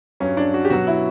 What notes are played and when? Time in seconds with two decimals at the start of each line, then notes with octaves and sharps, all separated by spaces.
0.20 G2 F#3 C#4
0.37 D4
0.54 F#4
0.65 G4
0.70 B2 F#3 F#4
0.87 E4